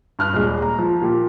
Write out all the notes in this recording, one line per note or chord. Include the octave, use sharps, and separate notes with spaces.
G2 F6 F#6
D#1 G#3
A#5
F3
A#2 G4